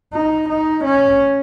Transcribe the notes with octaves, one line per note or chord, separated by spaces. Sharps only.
D#4
D#4
C#4